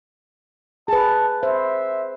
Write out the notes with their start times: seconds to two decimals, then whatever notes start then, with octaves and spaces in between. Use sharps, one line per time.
0.88 G#4 B4 A5
1.43 C5 E5